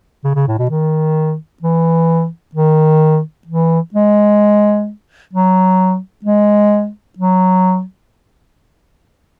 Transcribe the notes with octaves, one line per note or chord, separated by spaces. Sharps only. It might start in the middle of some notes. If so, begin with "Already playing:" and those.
C#3
C#3
A2
B2
D#3
E3
D#3
E3
G#3
F#3
G#3
F#3